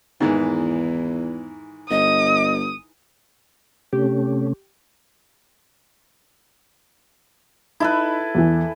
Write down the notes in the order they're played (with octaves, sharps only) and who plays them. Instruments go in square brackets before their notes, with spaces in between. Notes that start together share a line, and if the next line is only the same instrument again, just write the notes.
[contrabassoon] E2 [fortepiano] G#2 D#3 E3
[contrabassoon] G1 [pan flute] D#5 [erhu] D#6
[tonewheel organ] C3 A3 C#4 [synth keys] G4
[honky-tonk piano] D#4 [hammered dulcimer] E4 A4 B4
[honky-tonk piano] E2 E3